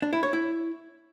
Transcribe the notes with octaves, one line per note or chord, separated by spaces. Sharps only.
D4
E4
C#5
E4